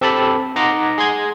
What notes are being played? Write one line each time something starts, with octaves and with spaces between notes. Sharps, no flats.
C4 G4 A4 A5 B5
D#4 D#5 F#5 A#5 C6 D6
G#4 C6 G#6